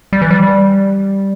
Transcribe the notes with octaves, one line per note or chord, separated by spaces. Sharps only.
G3
E3
G3